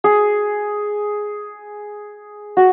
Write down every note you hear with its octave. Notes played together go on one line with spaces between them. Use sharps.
G#4
F#4